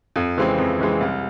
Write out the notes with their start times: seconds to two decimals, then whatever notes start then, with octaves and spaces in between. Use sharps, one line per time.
0.16 F2
0.37 C#3 E3 G#3 C4
0.58 F2
0.79 C#3 E3 G#3 C4
1.01 C2